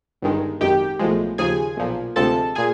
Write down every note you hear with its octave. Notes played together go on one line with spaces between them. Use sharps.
G1 G2 D#3 G#3
G#1 F#2 D#3 G4 G5
B1 A2 F3 G#3
D#2 C#3 F3 G#4 G#5
B1 A#2 F3
D2 C3 F3 G#3 A4 A5
A#2 G#4 G#5